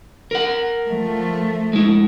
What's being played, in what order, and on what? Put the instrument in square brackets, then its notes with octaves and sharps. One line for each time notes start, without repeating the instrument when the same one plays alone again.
[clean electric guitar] A#4 F#5
[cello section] F3 A3
[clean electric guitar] G#3 E4